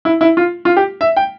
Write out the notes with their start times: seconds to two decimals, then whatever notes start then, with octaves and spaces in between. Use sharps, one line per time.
0.05 E4
0.21 E4
0.37 F4
0.65 F4
0.77 G4
1.01 E5
1.17 G5